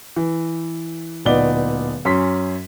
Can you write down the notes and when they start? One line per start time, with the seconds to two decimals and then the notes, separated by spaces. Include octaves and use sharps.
0.16 E3
1.25 D1 A#2 B3 D#4 D5 G7
2.05 F#2 C#4 C6 B6